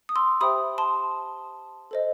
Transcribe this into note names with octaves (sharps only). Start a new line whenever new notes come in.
D#6
C6 E6
G4 C5 E5 G5 B5 D#6
A5 C6
A4 C5 D#5